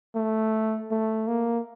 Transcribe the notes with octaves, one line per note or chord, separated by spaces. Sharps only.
A3
A3
A#3